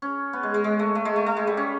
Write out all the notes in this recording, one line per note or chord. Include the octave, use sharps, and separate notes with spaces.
C#4
B3
G#3
G#3
G#3
A3
A3
G#3
A3
A3
G#3
G3
C#4